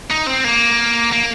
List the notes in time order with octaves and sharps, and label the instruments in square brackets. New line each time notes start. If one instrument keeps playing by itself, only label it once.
[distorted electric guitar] D#4
C4
A#3
A#3